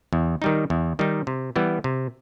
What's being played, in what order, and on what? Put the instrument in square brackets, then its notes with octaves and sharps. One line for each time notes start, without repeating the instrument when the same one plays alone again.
[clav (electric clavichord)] E2
D#3 G3 D#4
E2
D#3 G3 D#4
C3
E3 G3 B3 E4
C3